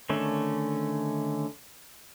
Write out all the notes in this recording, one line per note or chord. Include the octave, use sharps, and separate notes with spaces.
D3 D#3 A3 C#4